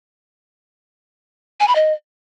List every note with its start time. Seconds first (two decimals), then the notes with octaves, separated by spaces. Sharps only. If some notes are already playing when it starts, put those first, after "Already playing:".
1.60 G#5
1.68 B5
1.75 D#5